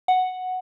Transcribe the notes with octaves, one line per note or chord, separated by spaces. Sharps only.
F#5